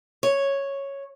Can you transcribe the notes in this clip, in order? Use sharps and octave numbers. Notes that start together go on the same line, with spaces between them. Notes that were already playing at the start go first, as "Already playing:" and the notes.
C#5